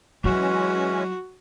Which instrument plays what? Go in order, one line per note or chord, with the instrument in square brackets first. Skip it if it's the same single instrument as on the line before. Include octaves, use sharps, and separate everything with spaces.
[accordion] E3 G#3 C#4 [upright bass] F#3 [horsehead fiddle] F#4